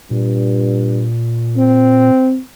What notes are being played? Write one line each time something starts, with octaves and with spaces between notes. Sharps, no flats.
G2 A#2
C4